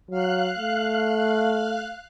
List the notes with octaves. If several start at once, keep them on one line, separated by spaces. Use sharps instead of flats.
F#3 F5 F#6
A3